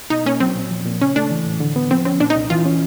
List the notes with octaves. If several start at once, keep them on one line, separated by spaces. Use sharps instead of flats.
B2 D#4
A#3 C#4
F#3 C4
A#2
F3
A#2
C#3 C#4
A3 D4
E3
A2
D3
B3
F3 C4
C4 C#4
A#2 D4
D#4
C2
E3 F4
C#4